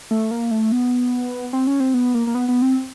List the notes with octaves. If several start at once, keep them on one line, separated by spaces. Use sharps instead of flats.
A3
A#3
A3
B3
C4
C#4
C4
B3
A#3
A#3
B3
B3
C4